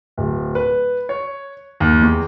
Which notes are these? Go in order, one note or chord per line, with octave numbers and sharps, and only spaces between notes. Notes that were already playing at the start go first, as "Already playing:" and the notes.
D1
B4
C#5
D#2
E2